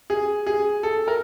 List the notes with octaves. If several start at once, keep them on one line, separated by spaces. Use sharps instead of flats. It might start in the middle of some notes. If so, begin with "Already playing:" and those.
G#4
G#4
A4
A#4